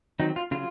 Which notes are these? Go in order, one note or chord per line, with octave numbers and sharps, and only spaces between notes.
D#3 F#3 C4 D#4
F4
C#3 F#3 F4